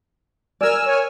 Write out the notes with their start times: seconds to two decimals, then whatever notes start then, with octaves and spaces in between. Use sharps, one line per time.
0.61 A#4 D5 G#5 E6 F6
0.85 C#5 G#5 F6